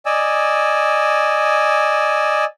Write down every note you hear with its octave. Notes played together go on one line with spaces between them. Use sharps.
D5 D#5 G#5 E6